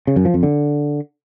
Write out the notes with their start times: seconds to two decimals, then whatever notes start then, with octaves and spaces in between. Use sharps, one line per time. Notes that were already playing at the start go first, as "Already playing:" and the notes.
0.07 C#3
0.16 F#2
0.25 F3
0.34 F2
0.43 D3